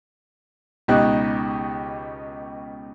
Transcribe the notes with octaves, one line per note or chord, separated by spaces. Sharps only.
C#2 B2 D#4 G4 D#5 F#6